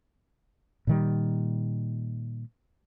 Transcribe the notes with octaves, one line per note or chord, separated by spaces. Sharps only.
A#2 D#3 G3